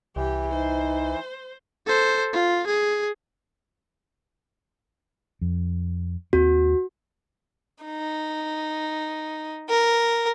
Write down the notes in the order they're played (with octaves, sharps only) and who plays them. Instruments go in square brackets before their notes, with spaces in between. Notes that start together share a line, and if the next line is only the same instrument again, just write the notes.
[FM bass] C2 [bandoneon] E3 [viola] G4
[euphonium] D#4 [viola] C5
[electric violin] A4 C5
F4
G#4
[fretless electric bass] F2
[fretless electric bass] D#2 C4 [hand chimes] F#4
[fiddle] D#4
A#4